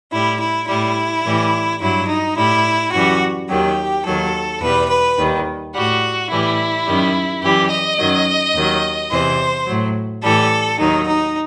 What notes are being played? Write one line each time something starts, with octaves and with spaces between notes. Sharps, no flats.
A2 G3 E4
E4
A2 G3 E4
A2 E3 G3
G2 F#3 E4
D#4
A2 G3 E4
F#2 E3 G3 F#4
D#2 D#3 F#3 G4
D#2 D#3 F#3 A4
E2 B2 G3 B4
B4
D#2 D#3 G3
A2 G3 F#4
A2 E3 G3 E4
F#2 D#3 G3
F#2 E3 G3 G4
D#5
F#2 D#3 F#3
D#2 D#3 F#3
E2 C3 E3 C5
A2 F#3
A2 E3 G3 A4
D#2 D#3 F#3 D#4
D#4